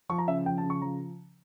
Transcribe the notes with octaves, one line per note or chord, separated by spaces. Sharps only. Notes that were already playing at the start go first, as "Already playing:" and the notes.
F3 C#6
A#5
C#3 E5
F3 G5
A5
C#3
C#6
F3 A#5